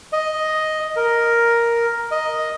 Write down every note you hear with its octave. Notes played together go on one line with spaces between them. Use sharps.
D#5
A#4
D#5